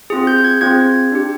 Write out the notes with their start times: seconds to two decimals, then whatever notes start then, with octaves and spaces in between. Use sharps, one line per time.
0.10 C4 F4 G#4
0.27 G6
0.38 G6
0.44 G#6
0.61 C4 F4 G#4 G#6
1.12 D4 G4